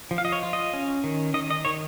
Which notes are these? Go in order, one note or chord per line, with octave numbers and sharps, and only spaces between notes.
F3
F5
D#5
C#5
F4
D#5
C#4
D#3
D#3 D#5
D#5
D#3 C#5